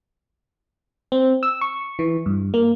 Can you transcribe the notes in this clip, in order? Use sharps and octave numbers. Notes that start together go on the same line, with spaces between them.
C4
E6
C#6
E3
G2
A#3